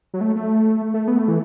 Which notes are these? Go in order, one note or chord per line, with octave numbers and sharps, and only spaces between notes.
F#3
A3
A3
A3
B3
A3
E3